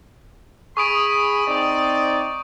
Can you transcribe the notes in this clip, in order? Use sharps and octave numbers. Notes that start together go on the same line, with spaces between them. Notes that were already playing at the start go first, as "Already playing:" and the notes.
G#4 B5 C#6 D#6 D7
C4 D#4 D5